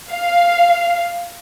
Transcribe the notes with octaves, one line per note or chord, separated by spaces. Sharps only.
F5